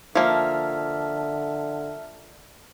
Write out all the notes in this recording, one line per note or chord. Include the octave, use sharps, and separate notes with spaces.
D3 F3 A#3 E5 A5 F6